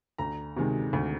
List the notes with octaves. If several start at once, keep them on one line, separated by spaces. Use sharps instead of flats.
D2 A#5
C3 D#3 G#3
D2